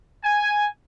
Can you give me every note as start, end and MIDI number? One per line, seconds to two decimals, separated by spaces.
0.24 0.66 80